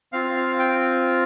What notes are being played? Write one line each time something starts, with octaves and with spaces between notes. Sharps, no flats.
C4 F4 F5
F5
G5